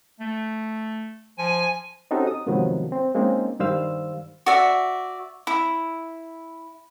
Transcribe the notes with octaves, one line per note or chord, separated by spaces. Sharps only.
A3
F3 G#5
C4 C#4 D#4 F#4 G4 A4
D#6
G#2 C3 D#3 F3 F#3 B3
C4
G#3 A#3 C4 C#4 D#4
G2 D#3 G3 C5 F5 E6
F#4 D5 E5
E4